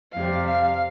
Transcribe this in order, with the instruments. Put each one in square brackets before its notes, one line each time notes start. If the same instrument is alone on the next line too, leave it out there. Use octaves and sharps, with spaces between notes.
[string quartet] F2 C3 G3 F5
F5